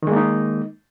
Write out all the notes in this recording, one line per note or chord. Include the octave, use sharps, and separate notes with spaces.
D#3 G#3 A#3 D#4